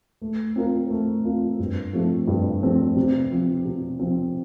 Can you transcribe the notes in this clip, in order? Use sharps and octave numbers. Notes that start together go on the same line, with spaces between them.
A3
C4 F4 A#4
A3
C4 F4 A#4
G2
F3 A3 C4 G4
G2
F3 A3 C4 G4
C3
F3 C4
C3
F3 C4